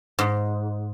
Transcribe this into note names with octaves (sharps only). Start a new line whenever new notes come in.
G#2